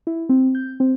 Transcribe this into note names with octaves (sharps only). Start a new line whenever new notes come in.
E4
C4
G6
C4